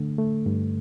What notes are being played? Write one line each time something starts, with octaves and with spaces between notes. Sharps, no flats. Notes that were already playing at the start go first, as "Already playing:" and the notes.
Already playing: D3 A3
A3
G2